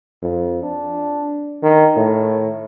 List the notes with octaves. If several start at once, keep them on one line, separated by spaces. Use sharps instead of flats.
F2
D4
D#3
A2